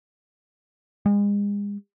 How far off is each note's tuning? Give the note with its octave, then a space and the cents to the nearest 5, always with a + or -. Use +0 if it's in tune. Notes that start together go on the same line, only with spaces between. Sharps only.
G#3 -35